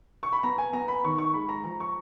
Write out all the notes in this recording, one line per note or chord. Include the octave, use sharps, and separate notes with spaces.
C#6
B5
B3 A#5
G#5
B3 A#5
B5
D#3 C#6
C#6
G#3 B5
A#5
F3 A#5
C#6